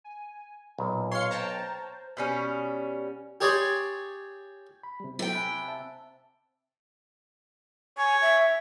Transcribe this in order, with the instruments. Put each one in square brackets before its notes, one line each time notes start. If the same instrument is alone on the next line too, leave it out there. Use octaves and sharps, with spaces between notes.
[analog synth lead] G#5
[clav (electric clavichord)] B1 [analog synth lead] A#2
[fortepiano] C#5 F5 [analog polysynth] C6 C7 C#7
[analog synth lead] C5 [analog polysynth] G5 A5 A#5
[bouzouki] B2 G3 C#4
[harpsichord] G4 G#4 C#5 D5 G#5 C6
[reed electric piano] B5
C3 G3
[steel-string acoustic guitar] C3 G5 [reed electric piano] F#3 E4
[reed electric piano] G#5 B5 F#6
E5 A5
[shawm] C#5 [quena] G#5
[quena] E5